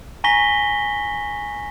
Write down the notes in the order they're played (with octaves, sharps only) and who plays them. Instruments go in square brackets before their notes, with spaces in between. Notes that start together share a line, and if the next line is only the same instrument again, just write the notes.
[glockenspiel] G#5 A#5 C#6 A#6 B6 G7